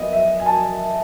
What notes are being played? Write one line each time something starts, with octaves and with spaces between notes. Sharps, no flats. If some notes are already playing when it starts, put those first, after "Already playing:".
Already playing: B3 D#5 E5
E5
G#5
A5
G#5